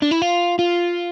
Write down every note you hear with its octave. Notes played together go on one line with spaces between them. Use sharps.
D4
E4
F4
F4